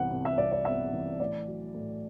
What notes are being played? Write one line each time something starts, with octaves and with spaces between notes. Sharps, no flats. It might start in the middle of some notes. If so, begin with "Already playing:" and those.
Already playing: C2 C3 E3 B3 F#5
C3
E5
C2 D5
D5
B3 E5
E3
A2 D5
F#3
A2